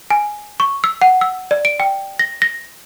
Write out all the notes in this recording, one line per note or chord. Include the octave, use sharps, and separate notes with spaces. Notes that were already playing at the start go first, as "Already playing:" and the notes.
G#5
C#6
E6
F#5
E6
D5
D7
G5
A#6
A#6